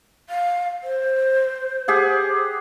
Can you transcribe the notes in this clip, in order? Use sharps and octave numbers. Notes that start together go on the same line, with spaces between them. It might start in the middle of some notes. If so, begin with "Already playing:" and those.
F5
C5
G4 G#4 F#5